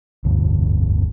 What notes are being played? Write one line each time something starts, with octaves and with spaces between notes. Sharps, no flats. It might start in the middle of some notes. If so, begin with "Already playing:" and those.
F1 D2 G2 D3